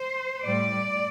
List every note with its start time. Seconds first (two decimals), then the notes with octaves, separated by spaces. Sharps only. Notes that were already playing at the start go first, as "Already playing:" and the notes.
Already playing: C5
0.45 A2 G3 D5